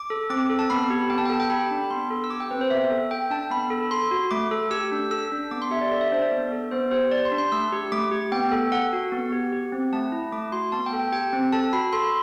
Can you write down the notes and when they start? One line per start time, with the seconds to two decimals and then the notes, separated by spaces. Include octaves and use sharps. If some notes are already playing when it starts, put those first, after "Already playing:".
Already playing: D6
0.10 A4
0.30 C4 D6
0.50 A4
0.59 A5
0.70 B3 B5
0.90 G4
1.10 B3 G5
1.18 A5
1.25 G5
1.30 A4 A5
1.40 G5
1.50 G4 B5
1.71 D4
1.90 B3 C6
2.10 A4
2.24 E6
2.30 G4 D6
2.40 G5
2.51 C4 B4
2.61 C5
2.70 B3 E5
2.90 A4
3.11 A4 G5
3.30 D4 A5
3.51 B3 B5
3.70 A4
3.91 A4 C6
4.11 F#4
4.31 A3 D6
4.51 A4
4.71 G4 E6
4.92 D4
5.11 A4 E6
5.32 D4
5.51 B3 D6
5.62 C6
5.71 G4 E5
5.81 D5
5.92 A4 D5
6.01 E5
6.12 D4 C5
6.22 D5
6.31 B3
6.52 A4
6.71 B3 C5
6.91 G4 C5
7.12 G4 D5
7.25 C6
7.32 D4
7.38 C6
7.52 A3 E6
7.72 G4
7.92 A3 D6
8.11 G4
8.32 B3 G5
8.52 A4
8.72 A4 F#5
8.93 F#4
9.12 B3
9.32 G4
9.52 G4
9.72 C4
9.93 A3 A5
10.12 E4
10.32 A3 D6
10.52 F#4 C6
10.72 B3 A5
10.86 G5
10.93 A4
10.99 G5
11.12 G4 G5
11.33 C4
11.52 A4 A5
11.73 F#4 B5
11.93 A4 C6